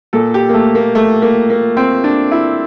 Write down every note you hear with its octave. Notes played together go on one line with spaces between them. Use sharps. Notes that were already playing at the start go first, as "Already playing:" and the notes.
A#2 A4
G4
A#3
A3
A#3
A3
A#3
A#3
C4
D4
E4